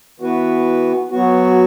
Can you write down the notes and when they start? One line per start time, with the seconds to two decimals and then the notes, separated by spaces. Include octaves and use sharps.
0.20 E3 B3 F#4 B4
1.11 F#3 B3 F#4